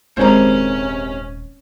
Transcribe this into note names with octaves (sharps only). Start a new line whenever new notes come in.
D#1 G#2 C3 D#3 C#4 C5 C#5 A#5